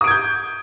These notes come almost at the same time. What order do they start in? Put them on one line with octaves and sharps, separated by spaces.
D#6 D7 G#6 G6